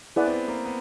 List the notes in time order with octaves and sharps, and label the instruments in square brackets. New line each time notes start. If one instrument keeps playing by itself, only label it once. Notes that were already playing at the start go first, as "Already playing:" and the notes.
[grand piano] B3 [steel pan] E4 G#4 B4 D5 F#5
[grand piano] C4
B3
A#3
B3